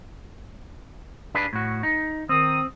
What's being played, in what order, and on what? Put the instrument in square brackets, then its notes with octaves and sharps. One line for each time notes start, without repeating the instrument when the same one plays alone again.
[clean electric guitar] D4 G#4 B4
A2 F#4
D#4
[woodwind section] D#3 D#6 [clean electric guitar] C4